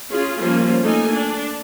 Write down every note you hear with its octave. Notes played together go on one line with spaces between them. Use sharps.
C#4 F4 G#4
F3 G3 A#3 C#4 F4
A3 A#3 D#4 A4 G#5
D4